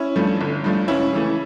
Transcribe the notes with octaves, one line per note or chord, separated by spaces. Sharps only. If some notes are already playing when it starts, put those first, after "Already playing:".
Already playing: C#4 E4
G2 F3 A3
G1
G2 F3 A3
C#2 C#4 E4
C#3 E3 A3